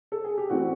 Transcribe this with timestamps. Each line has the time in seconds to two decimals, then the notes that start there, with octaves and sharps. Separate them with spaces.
0.12 A4
0.24 G#4
0.38 G4
0.50 A2 E3 G3 C4 F#4